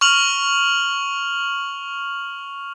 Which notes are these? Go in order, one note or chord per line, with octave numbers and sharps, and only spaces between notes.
C#6 F6 F7 F#7